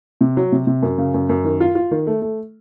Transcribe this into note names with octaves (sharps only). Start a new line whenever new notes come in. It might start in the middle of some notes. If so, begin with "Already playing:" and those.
C3
F#3
C3
C3
F#2
C#3
F#2
F#2
D#3
F4
F4
D#3
A3
A3